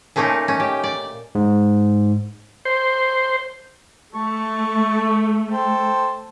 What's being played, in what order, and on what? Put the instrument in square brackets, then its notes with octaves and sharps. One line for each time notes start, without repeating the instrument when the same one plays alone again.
[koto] A#2 A3 A#3 C#4 D#4
C#4
G4
D5
[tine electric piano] G#2
[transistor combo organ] C5
[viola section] A3 [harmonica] A5 C#6
[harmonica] A4 C5 G5